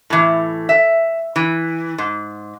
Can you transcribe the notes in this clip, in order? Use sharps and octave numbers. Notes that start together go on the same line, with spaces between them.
A2 E3
E5
E3
G#2